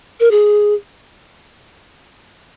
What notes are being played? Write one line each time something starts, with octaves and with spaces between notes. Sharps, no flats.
A#4
G#4